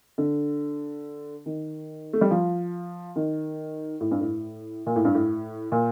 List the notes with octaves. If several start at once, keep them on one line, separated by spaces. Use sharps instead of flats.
D3
D#3
A3
G3
F3
D#3
A2
G2
A2
A#2
A2
G2
A2
A#2